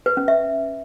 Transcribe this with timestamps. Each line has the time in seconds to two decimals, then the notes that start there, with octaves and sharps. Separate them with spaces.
0.06 B4
0.17 C#4
0.28 E5